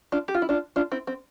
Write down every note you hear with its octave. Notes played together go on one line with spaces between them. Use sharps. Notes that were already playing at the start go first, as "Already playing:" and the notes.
D4 F4
G4
F4
E4
D4 F4
D4 F4
C4 E4
C4